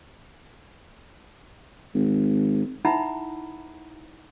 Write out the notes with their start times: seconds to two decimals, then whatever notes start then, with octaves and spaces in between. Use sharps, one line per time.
1.95 G#1
2.85 D#4 E4 E5 F#5 A#5 B5